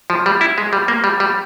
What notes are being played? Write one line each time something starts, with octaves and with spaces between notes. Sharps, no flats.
F3
G3
E4
G#3
G3
A#3
G3
G3